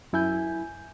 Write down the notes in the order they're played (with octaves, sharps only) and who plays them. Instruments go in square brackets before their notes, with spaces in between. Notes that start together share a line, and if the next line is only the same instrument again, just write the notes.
[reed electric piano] F#2 E4 G#5 G6